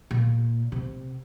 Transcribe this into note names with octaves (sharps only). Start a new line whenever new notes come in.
A#2
C3